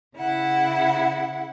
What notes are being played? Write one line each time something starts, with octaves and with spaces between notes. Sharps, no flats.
C#3 E4 F#5